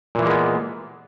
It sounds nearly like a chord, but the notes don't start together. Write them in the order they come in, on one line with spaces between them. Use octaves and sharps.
A#2 E3 A#3 G#3 B3